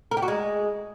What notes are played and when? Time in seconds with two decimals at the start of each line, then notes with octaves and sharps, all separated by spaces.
0.11 A#4
0.17 G4
0.22 F#4
0.28 G#3